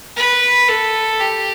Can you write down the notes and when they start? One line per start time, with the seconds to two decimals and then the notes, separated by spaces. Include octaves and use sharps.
0.16 B4
0.68 A4
1.19 G4